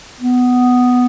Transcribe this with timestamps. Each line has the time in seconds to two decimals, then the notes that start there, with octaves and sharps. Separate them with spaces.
0.20 B3